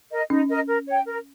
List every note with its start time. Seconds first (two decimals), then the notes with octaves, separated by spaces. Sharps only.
0.11 A#4 D#5
0.29 C#4 D#4
0.49 A#4 D#5
0.67 A#4
0.87 C#5 G5
1.06 A#4